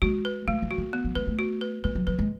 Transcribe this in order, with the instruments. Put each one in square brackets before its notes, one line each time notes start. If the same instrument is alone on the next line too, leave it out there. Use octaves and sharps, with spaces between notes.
[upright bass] G#3 [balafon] F#4
[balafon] B4
[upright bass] G#3 [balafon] A3
[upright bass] E3
[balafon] F#4
[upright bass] D#3
[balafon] B3
[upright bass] F#3
[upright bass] G#3 [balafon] B4
[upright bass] A3
[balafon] F#4
B4
[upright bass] G#3 [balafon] B4
[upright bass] F#3
[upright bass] F#3 [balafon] B4
[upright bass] G#3